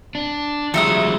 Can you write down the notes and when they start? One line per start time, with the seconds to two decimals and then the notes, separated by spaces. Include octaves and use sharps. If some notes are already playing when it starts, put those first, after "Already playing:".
0.15 D4
0.74 F3 F#3 G#3 D#4 E5 D#6